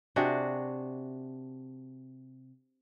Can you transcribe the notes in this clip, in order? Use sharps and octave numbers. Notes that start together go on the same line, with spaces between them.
C3 D4 F#4 G#4